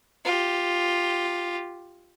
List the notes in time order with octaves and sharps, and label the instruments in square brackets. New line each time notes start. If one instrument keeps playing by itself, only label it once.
[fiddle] F4 G4